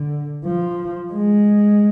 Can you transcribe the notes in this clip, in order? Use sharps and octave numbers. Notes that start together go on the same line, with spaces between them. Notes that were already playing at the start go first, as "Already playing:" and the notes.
Already playing: D3
F3
G#3